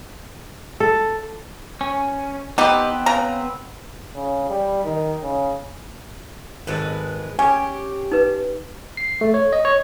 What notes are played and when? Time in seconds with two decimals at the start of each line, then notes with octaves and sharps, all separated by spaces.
0.80 A4
1.81 C#4
2.58 B3 C4 D#4 G4 B4
3.06 C#3 A#5
4.15 C#3
4.49 G3
4.84 D#3
5.22 C#3
6.67 G#1 G#3 A4 B4
7.39 C#4 G4 G#5
8.12 D#4 B4
8.97 C7
9.21 A3
9.34 C#5
9.53 D#5
9.65 C#5